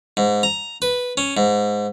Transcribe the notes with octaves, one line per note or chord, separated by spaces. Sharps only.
G#2
A#5
B4
C#4
G#2